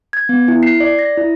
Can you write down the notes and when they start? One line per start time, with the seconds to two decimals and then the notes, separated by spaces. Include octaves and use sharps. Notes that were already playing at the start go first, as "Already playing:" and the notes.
0.13 G#6
0.29 B3
0.48 E4
0.63 C7
0.80 D5
0.99 A#6
1.17 E4